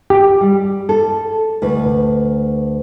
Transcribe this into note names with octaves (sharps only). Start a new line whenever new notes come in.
G4
G3
A4
D2 B4